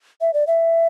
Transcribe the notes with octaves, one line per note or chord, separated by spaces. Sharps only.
E5
D5
E5